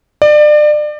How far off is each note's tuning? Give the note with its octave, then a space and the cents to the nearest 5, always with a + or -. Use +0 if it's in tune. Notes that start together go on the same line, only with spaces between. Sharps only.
D5 +30